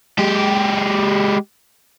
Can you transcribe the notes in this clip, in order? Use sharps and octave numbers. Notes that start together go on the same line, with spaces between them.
G#3 G4